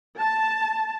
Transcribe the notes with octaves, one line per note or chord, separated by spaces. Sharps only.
A5